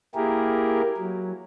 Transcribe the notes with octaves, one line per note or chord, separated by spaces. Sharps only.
A#3 E4 G4 G#4 A#4
F#3